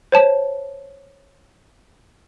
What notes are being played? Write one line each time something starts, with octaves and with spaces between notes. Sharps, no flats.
C5 C#5 A5